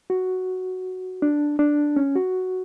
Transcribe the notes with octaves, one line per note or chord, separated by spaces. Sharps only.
F#4
D4
D4
C#4
F#4